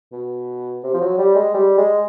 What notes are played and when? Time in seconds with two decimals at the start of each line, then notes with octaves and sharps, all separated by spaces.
0.12 B2
0.83 C3
0.94 F3
1.00 F#3
1.18 G3
1.35 G#3
1.54 G3
1.78 G#3